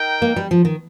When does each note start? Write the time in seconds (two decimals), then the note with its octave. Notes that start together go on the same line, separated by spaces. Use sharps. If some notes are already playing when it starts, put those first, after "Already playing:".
Already playing: D#4 A#4 G5
0.22 A#3
0.36 G3
0.51 F3
0.65 D#3